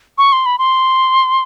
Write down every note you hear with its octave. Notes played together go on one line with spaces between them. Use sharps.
C#6
C6
B5
C6